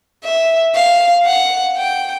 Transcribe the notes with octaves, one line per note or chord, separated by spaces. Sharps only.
E5
F5
F#5
G5